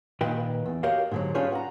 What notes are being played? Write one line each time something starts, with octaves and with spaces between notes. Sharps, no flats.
A#2 D#3 B4 D#5 G5
E2
F#4 G4 A#4 C#5 D#5 F5
G#2 D3 F#3
C#4 D4 F4 G4 G#4 B4
F#5 A#5